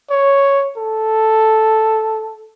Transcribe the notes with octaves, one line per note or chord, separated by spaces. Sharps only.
C#5
A4